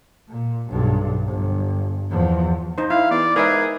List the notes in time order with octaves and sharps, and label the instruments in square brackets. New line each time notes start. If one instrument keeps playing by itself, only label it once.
[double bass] A#2
B1 G2
G1
E2 F3
[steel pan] D#4 C5
[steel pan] E4 [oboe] F5
[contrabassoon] E2 [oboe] D5
[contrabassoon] G#2 [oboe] G#4 [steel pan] A#4 B4 E5